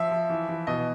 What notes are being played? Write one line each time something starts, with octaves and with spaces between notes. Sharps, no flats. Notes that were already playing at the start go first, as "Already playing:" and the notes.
Already playing: F3 E5
F3
E3
E3
B2 D#5